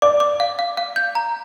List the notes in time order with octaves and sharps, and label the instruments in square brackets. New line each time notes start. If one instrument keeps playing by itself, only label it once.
[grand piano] D5 [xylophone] D6
[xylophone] D6
F5
F5
F5
G6
A#5